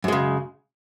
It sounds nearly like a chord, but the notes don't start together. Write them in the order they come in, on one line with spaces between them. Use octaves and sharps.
F#2 G#3 C#3